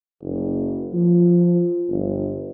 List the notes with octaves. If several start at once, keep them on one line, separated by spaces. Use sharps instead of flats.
F#1
F3
G1